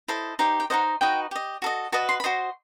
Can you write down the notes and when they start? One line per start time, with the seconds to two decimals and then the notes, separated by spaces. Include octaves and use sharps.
0.08 E4 A4 C5 D#5
0.39 D#4 G4 C5 G5
0.60 G5
0.70 D#4 A4 C5 D#5 F#5
1.01 D#4 F#4 B4 D#5 G5
1.31 G4 D#5
1.62 F#4 A4 D#5
1.92 F#4 B4 D#5 A5
2.09 C6
2.20 B5
2.24 F#4 C5 D#5 C6